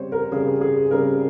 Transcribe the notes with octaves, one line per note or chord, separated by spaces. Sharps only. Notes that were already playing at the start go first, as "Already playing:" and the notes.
Already playing: C#3 G3 C4 C5 C#5
A#4
C#3 G3 C4 G#4
G#4
C#3 G3 C4 A#4